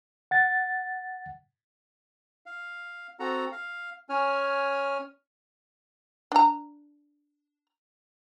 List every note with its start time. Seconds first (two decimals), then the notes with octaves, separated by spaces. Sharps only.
0.31 F#5 A6
2.46 F5
3.20 C4 F#4 A4 F#5 A#5
3.52 F5
4.09 C#4 C#5 G#5 F6
6.32 D4 A#5